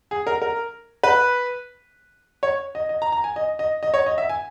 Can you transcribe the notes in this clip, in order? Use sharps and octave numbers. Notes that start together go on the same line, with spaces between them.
G#4
A#4
A#4
B4
C#5
D#5
D#5
A#5
A#5
G#5
D#5
D#5
D#5
C#5
D#5
E5
G#5